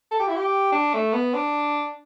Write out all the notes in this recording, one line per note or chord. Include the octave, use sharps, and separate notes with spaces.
A4
G4
E4
G4
D4
A3
B3
D4